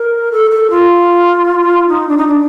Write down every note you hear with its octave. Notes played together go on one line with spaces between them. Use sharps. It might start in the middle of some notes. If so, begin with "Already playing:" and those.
Already playing: A#4
A4
A4
F4
D#4
D4
D#4
D4